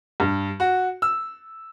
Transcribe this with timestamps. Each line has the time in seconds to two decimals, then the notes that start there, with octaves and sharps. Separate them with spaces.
0.20 G2
0.60 F#4
1.02 E6